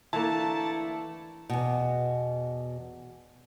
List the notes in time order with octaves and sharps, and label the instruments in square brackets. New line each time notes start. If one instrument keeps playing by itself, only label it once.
[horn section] D3 A3 E4 [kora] E3 A#3 [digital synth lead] A5
[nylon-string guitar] E2 B2